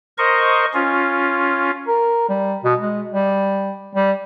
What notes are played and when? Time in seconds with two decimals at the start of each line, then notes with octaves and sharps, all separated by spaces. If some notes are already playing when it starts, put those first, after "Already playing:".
0.18 A#4 C5 D#5 C#6
0.74 C#4 F4
1.88 A#4
2.29 G3
2.64 B2
2.81 G#3
3.11 G3
3.95 G3